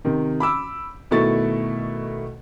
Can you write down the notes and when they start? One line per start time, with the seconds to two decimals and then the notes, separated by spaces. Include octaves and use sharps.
0.05 C3 D#3
0.40 B5 D6 E6
1.11 B2 D#3 A3 E4 C#6 A6